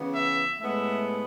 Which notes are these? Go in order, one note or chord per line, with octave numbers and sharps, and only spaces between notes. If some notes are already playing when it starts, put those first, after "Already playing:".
Already playing: C#3 E3 B3
E5
A2 G#3 B3 E5